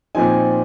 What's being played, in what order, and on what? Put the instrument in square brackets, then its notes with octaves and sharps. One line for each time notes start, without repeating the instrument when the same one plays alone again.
[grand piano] A#2 F3 C4 D#4 G#5